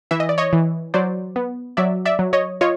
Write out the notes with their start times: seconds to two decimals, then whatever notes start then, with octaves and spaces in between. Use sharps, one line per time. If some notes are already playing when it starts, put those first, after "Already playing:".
0.11 E3 E5
0.20 D#5
0.29 D5
0.38 C#5 D#5
0.53 E3
0.94 F#3 C5 D5
1.36 B3
1.77 F#3 D5 E5
2.05 D5 E5
2.19 F#3
2.33 C#5 D#5
2.61 F4 C#5 D#5